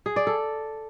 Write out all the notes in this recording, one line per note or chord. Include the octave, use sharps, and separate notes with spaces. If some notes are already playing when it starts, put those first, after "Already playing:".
G#4
D5
A4